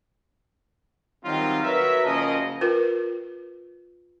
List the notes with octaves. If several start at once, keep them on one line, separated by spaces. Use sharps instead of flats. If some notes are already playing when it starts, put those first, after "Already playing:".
D#3 F#3 G3 C4 D#4 F4
F#4 A#4 B4 C#5 E5
F#1 F#2 C#3 F3 A#4 D#5
F4 A#4 B4